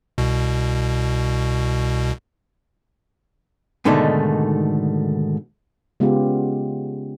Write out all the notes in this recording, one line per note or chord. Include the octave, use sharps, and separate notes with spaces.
C2 B2
G#2 B2 D3 D#3 A3
C#3 G#3 B3 C#4 F4 G4